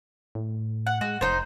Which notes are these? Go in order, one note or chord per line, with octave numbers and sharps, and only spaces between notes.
A2
F#5
G#3 F#4
F1 D#4 C5